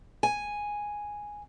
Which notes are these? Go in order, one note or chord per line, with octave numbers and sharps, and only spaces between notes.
G#5